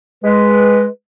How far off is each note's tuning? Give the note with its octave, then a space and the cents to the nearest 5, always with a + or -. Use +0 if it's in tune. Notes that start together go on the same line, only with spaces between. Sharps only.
G#3 +0 B4 -5